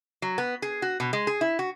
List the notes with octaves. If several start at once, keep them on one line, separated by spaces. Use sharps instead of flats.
F#3
B3
G#4
F#4
B2
G#3
G#4
E4
F#4